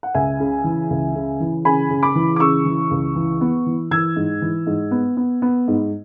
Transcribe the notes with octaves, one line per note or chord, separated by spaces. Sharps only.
F#5
C#2 E5 G#5
C#3
E3
C#2
C#3
E3
C#3 G#5 B5
C#3
B5 D6
E3
D6
C#3 C#6 E6
E3
C#2
E3
B3
E3
E3 E6 G#6
G#2
E3
G#2
B3
B3
B3
G#2